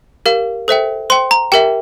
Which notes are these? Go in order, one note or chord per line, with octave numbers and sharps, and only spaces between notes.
G4 A#4 F5
A4 C5 E5 G5
C5 G5 C6
A#5
G4 A#4 E5 G5